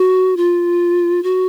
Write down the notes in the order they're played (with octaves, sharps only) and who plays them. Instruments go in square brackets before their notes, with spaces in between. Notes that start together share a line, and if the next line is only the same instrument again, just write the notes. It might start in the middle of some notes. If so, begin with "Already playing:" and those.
Already playing: [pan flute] F#4
F4
F#4